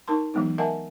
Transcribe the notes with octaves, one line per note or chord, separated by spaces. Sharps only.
D#4 A#4 A5 C6
E3 F#3 G#3 B3 D#4
A#4 D#5 E5 F#5 G#5 A5